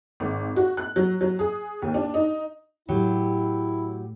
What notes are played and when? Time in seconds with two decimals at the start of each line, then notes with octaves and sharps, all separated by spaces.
0.20 G#1
0.56 F#4
0.77 F#6
0.96 F#3
1.21 F#3
1.39 G#4
1.82 D#2
1.94 D4
2.14 D#4
2.89 A2 F#3 E4 G4